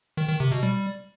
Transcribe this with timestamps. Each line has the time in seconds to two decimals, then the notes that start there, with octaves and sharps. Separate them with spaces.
0.17 D#3
0.29 D#3
0.40 C3
0.51 B2
0.63 G3